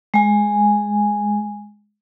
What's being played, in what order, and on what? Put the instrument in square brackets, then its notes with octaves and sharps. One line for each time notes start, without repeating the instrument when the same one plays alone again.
[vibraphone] G#3 G#5